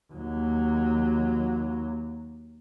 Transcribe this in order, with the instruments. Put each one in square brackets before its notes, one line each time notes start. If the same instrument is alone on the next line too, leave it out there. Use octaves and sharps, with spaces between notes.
[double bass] D#2 F#3